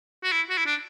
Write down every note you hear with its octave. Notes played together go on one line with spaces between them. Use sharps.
F#4
E4
F#4
E4
D4